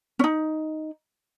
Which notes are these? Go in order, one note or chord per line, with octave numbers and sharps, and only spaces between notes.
C#4 D#4